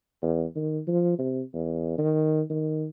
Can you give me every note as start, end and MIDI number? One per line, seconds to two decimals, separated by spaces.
0.22 0.45 40
0.55 0.80 51
0.87 1.18 53
1.18 1.41 48
1.54 1.97 40
1.98 2.42 51
2.50 2.86 51